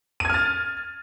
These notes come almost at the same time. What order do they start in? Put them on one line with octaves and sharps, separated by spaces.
D#7 G#6 F6 A6